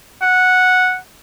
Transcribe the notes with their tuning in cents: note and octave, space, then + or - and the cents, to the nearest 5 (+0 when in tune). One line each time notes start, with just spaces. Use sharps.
F#5 -5